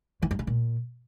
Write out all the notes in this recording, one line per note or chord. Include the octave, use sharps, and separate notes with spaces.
E3
G2
C#3
A#2